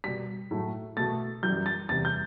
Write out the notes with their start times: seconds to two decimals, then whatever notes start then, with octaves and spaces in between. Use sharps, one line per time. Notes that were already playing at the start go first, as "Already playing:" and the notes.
0.04 B2 G3 B6
0.51 A2 F#3 A3
0.97 B2 A3 A6
1.43 F#2 E3 G3 G6
1.66 A6
1.89 E2 C3 G3 A6
2.05 G6